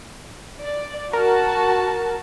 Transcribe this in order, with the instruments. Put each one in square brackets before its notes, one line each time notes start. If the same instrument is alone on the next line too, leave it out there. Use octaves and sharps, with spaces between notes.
[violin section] D5
[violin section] F#4 A5 [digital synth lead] A#4